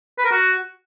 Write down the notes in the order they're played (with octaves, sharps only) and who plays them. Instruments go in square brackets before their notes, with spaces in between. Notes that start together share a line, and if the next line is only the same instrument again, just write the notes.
[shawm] B4
A#4
F#4